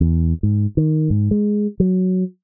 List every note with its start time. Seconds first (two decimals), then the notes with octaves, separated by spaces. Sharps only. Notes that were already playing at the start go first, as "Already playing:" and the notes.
0.01 E2
0.43 G#2
0.77 D#3
1.10 G#2
1.31 G#3
1.80 F#3